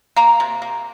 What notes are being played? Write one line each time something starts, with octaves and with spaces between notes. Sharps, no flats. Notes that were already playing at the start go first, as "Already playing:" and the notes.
A#3 A#5
C3
A#3